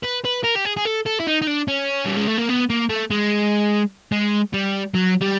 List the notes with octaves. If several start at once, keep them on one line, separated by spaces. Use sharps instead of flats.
B4
B4
A#4
G4
G#4
G#4
A4
A4
E4
D#4
D#4
D4
C#4
G3
G#3
A3
A#3
B3
A#3
A3
G#3
G#3
G3
F#3
G3